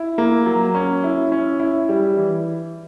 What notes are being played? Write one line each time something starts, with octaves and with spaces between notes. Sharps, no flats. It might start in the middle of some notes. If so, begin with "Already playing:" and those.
Already playing: E4
A#3
F#3
C#4
E4
C#4
E4
G3
E3